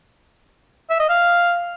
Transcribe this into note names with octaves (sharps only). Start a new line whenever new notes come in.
E5
D#5
F5